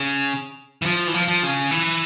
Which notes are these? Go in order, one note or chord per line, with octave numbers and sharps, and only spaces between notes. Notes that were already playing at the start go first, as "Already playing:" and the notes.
Already playing: C#3
E3
F3
E3
F3
F3
C#3
E3